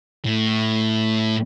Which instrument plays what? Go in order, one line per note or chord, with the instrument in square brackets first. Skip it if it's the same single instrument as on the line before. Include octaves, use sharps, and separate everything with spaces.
[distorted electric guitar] A2